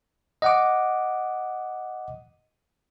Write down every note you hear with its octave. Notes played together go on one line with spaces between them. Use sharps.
D#5 F#5 D6